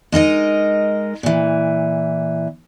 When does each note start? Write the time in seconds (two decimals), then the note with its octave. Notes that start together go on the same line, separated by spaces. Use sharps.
0.12 G#3 D#4 A#4 D#5
1.23 A#2 E3